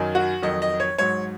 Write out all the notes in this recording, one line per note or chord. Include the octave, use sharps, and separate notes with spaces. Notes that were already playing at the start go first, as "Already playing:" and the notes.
Already playing: F#2 D#3 F#3
F#4
F2 D#3 F#3 D#5
D#5
C#5
G#2 F#3 C#5